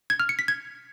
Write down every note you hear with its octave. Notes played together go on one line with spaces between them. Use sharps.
G#6
F6
C#7
B6
G#6